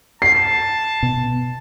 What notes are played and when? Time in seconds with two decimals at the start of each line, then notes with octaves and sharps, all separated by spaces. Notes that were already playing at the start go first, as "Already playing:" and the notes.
0.22 A5 C7
1.03 B2